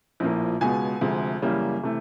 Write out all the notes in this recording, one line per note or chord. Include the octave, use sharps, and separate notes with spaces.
A#1 A2 F3 A#3
C#2 B2 G#3 B3 G#5
D2 C3 F3 G#3
F#2 C#3 E3 G3 A#3
C3 E3 A3